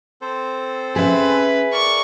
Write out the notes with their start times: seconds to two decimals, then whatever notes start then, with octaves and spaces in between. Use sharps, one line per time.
0.21 C4 A4 C5
0.96 C#4 G#4 B4 E5
1.72 A#4 D5 C#6